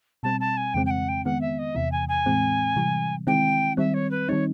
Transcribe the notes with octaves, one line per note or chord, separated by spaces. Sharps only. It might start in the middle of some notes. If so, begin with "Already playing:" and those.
B2 G3 C4 A5
A5
G#5
F2 C#3 E3 G#3 C4 G5
G5
F#5
G5
D#3 G#3 B3 F#5
E5
D#5
E2 C3 E3 E5
G#5
G#5
A2 E3 G#3 C4
C3 E3 G3
D#3 G#3 C4 E4 G5
D#3 G3 C4 E5
C#5
B4
D#3 G3 C4 D#4 C#5